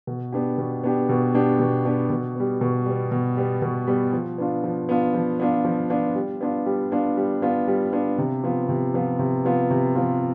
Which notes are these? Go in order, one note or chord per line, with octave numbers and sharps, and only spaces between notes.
B2
B3 D4 G4
B2
B3 D4 G4
B2
B3 D4 G4
B2
B3 D4 G4
B2
G3 B3
B2
G3 B3
B2
G3 B3
B2
G3 B3
F3
B3 D4 F4
F3
B3 D4 F4
F3
B3 D4 F4
F3
B3 D4 F4
G3
B3 D4 F4
G3
B3 D4 F4
G3
B3 D4 F4
G3
B3 D4 F4
C3
F3 B3 F4
C3
F3 B3 F4
C3
F3 B3 F4
C3
F3 B3 F4